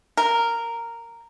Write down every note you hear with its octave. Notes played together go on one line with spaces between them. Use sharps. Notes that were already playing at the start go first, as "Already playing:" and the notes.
A#4